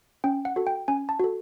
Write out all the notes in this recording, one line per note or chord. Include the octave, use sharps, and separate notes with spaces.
C#4 G5
F#5
F#4 A4
G5
C#4 G#5
A5
F#4 A4